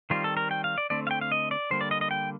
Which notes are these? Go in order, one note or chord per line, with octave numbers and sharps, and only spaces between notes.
D#3 G3 C4 F4
A4
A#4
G5
F5
D5
D3 A3 C4 D5
F5
G5
F5
D#5
D5
D3 G3 A#3 C5
D5
D#5
D#5
G5